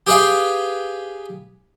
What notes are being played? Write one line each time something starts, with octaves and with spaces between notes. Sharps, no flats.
G4 G#4 B4 F5 G5